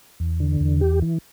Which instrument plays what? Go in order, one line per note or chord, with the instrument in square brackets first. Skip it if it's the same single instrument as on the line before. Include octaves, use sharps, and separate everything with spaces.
[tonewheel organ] E2
D3
E2
G4
E3